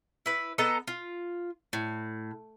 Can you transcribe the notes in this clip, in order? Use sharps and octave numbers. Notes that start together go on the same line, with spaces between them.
E4 B4
B3 A4 D#5 A#5
F4
A2